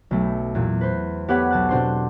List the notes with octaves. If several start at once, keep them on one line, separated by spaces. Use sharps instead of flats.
B1 A3
E2 A#2
B4 C5
B3 G4 A4 B4 C#5 F#5
B1 A5 F#6
B2 C4 D4 C5 C6 C7